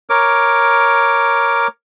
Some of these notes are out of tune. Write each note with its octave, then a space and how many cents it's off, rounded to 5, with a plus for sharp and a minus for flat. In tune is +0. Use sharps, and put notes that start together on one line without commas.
A#4 +0 C#5 +0 D6 +0